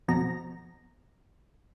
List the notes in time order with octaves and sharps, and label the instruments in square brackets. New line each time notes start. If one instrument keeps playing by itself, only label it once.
[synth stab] F2 B2 A#5